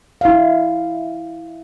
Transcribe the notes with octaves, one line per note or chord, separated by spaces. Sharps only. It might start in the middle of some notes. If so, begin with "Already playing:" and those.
E4 F5